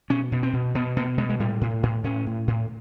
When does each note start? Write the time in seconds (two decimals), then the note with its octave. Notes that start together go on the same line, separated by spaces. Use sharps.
0.10 B2 C#4
0.32 B2
0.43 C4
0.53 B2
0.75 B2 B3
0.96 B2 A#3
1.18 B2 G#3
1.29 G#3
1.40 A2 G3
1.61 A2
1.83 A2
2.04 A2 C#4
2.26 A2
2.47 A2